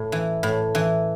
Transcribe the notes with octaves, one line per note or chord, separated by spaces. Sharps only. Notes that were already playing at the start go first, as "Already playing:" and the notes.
Already playing: A2
E3
A2
E3